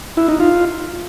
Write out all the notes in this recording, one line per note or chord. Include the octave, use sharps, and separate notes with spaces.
E4
D#4
F4